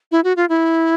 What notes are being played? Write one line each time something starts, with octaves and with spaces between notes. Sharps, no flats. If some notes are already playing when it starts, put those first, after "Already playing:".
E4
F#4
F4
E4